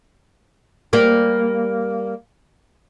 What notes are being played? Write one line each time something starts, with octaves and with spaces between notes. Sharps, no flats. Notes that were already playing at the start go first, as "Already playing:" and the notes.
G3 A#3